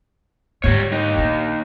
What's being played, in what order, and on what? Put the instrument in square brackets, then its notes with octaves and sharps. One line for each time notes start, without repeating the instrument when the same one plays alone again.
[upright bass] G#2 D3 [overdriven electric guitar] G3 C#5
[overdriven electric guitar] D#2 D#4
[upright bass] A#1 D4